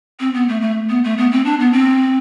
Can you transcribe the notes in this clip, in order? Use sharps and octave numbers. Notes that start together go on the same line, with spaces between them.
C4
B3
A3
A3
B3
A3
B3
C4
D4
B3
C4